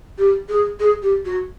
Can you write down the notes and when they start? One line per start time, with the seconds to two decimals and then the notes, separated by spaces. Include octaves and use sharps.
0.18 G4
0.49 G#4
0.80 G#4
1.02 G4
1.25 F#4